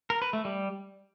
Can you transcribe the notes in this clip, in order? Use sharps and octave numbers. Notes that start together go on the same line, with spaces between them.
A#4
B4
A3
G3